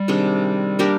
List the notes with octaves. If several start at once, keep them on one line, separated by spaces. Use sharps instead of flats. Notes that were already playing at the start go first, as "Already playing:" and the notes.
Already playing: G3
C3 D#3 G#3 D4
A#3 D4 G4 A#4